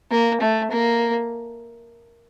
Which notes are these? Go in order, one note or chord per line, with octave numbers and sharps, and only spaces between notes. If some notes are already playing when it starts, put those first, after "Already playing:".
A#3
A3
A#3